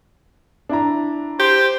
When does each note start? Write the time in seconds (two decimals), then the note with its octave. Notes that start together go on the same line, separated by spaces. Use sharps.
0.69 D4 E4 A#5
1.40 G4 C5